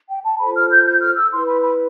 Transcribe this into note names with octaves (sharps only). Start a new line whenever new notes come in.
G5
A5
F4 A4 C5 B5
F6
G6
G6
F6
E6
E4 B4 C6
B5
B5